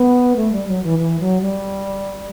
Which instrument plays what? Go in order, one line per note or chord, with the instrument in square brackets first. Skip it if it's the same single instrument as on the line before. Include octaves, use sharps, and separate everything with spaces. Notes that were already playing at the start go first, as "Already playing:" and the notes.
Already playing: [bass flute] B3
A3
G3
F#3
E3
E3
F#3
G3